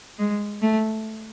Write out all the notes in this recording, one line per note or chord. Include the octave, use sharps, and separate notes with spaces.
G#3
A3